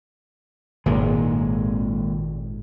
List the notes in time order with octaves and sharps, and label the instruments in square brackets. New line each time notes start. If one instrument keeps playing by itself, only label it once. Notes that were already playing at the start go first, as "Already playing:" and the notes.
[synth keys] G#1 [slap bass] A#2 G#3